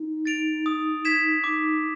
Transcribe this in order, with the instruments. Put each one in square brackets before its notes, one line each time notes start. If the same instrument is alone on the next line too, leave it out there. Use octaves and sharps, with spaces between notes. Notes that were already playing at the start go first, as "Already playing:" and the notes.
Already playing: [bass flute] D#4
[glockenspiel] A6 D7 F7
D#6
G#6 B6 E7
[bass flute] D#4 [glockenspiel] D6